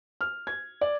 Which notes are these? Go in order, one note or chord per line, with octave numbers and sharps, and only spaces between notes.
F6
G#6
D5